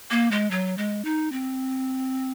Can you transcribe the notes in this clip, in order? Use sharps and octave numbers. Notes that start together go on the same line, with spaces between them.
A#3
G#3
F#3
G#3
D#4
C4